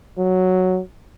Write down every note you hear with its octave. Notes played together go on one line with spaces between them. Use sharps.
F#3